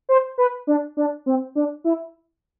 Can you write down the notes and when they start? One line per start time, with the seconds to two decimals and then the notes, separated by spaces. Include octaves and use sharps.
0.09 C5
0.38 B4
0.67 D4
0.97 D4
1.26 C4
1.55 D4
1.84 E4